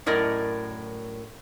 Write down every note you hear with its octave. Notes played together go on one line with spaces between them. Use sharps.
F#2 A2 A#4 D5 D#5